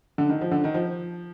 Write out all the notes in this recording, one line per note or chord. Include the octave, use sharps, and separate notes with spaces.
D3
D#3
F3
D3
D#3
F3